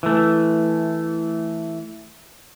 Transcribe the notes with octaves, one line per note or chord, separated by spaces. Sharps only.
E3 A3